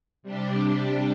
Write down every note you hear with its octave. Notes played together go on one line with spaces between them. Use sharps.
C3 G3 D4 G4